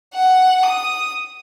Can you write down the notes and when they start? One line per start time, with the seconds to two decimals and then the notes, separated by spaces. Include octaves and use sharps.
0.14 F#5
0.63 D#6